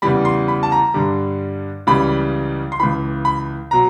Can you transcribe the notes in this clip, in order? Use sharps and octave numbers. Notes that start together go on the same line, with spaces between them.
E2 C#3 E3 G3 B5
C6
B5
A5
A#5
G2 D3 G3
C#2 C#3 E3 G3 B5
C6
C#2 C#3 E3 B5
B5
B2 F#3 A#5